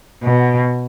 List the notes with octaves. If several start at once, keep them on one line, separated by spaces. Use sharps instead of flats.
B2